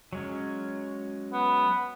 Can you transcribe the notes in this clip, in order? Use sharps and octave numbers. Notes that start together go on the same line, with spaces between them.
F#3 G#3 C#4
B3